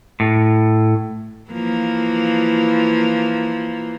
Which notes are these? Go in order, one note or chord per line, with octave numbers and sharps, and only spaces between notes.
A2
E3 F3 A#3